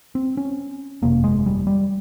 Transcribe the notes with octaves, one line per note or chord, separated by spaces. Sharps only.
C4
C#4
G1 F2 C3 A#3
G#3
G3
G3